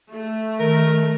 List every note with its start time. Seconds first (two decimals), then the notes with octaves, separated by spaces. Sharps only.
0.12 A3
0.60 D#3 A#4